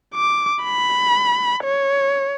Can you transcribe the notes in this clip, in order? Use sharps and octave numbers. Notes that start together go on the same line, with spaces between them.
D6
B5
C#5